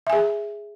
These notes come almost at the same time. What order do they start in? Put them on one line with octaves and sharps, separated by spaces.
E5 G#5 G#4